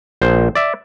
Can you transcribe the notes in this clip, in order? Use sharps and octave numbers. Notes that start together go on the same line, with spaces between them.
A#1 C5
D5 E5